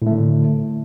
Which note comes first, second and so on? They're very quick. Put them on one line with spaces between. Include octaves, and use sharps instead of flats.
A2 A3 D3